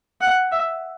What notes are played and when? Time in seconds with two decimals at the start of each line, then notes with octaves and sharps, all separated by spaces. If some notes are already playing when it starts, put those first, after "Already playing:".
0.21 F#5
0.51 E5